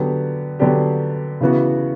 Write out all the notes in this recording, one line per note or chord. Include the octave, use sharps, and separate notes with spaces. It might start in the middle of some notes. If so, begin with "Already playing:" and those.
Already playing: D3 F#3 B3 D4 G4
D3 F#3 B3 D4 G4
C#3 E3 B3 F#4